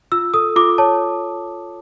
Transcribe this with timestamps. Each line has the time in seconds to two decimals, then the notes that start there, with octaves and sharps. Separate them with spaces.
0.12 F4 E6
0.34 A4 D#6
0.56 F4 D6
0.78 C#5 A5